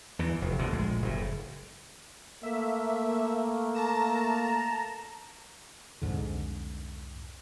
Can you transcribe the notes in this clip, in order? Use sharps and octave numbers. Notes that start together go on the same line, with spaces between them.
E2 E3
F1
D2 B2 D3
A#1 G#3
F#1 A2
A3 A#3 E5
A5 A#5 E7
C2 F2 G#2 D3